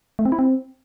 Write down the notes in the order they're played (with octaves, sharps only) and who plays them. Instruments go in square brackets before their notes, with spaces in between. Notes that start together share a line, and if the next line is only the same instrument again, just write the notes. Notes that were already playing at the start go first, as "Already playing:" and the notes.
[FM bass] A3
C4
E4
C4